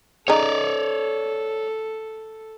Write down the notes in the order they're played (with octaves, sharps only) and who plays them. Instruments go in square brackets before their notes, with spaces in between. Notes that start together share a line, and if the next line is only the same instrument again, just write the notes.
[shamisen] C#3 D#4 [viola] A4 [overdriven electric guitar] C#5 D5